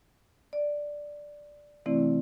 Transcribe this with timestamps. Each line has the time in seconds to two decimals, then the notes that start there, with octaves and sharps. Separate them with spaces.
0.53 D5
1.86 C3 E3 A3 C4 E4 D5